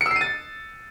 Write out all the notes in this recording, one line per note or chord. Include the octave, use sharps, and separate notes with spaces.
C#7
E6
C7
D#7
A6